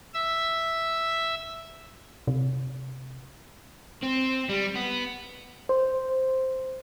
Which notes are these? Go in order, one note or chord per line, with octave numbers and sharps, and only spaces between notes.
E5 E6
C3
C4
G3
B3
C5